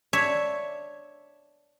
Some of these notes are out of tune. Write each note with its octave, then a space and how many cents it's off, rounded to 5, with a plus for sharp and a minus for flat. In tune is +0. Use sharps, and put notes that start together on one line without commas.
D4 +0 C#5 +0 E5 +0